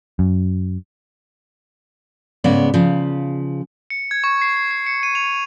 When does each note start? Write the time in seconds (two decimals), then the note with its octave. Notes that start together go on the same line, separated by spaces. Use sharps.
0.19 F#2
2.44 G#2 C#3 G#3 B3 D5
2.74 C#3 F3
3.90 C#7
4.11 G#6
4.24 C#6
4.42 C7
4.57 C7
4.71 C7
4.86 C#7
5.03 D#7
5.15 F7